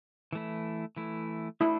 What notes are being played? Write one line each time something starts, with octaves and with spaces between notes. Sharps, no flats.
E3 A3 E4
E3 A3 E4
A3 D4 E4 F#4